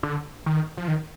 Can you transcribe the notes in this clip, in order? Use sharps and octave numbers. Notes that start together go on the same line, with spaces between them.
D3
D#3
F3
D#3